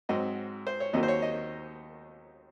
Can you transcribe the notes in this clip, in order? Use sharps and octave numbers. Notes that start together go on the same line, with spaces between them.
G#2 F#3 C4 D#5
C5
C#5
D#2 D#3 F#3 A#3 D#5
C5
C#5
D#5